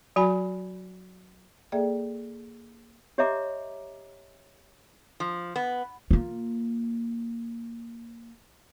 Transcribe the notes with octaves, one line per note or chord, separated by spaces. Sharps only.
F#3 F#4 G#5 B5
A#3 G#4 A4 D5 E5 G5
G4 C#5 D#5 E5 A#5 D6
F3
B3
A#3 F4